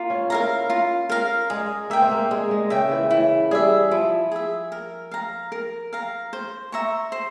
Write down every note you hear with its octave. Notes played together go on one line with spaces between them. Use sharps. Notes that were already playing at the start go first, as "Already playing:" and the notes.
Already playing: A#3 F4
C#4
E4 A#4 F5 A#5
F4
A#4 F5 A#5
G#3 G#4
A#3 E5 G5
C4
A#3
G#3 G#4
G#3
C#3 E5 G5
E3
C#3
E3 E4
G3 G#4 E5
F3 E4
G#4 E5
A#4
F5 A#5
A#4
F5 A#5
C5
E5 A#5 C#6
C5